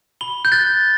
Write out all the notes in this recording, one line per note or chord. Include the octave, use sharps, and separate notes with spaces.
B5 G7
G6
F#6 A6